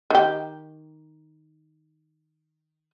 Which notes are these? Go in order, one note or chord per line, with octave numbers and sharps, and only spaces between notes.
D#3 G4